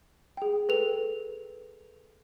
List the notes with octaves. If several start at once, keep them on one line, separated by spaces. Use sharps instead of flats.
G#4 G5
A4 B4 F7